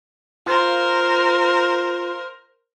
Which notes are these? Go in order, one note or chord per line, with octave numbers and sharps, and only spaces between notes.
F4 A#4 C5